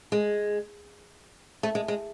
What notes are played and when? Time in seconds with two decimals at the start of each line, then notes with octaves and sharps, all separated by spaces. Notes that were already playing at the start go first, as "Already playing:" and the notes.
0.12 G#3
1.63 A3
1.75 G#3
1.88 G#3